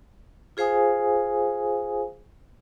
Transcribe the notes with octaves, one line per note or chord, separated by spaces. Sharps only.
F4 G#4 C5 F5 G#5 D#6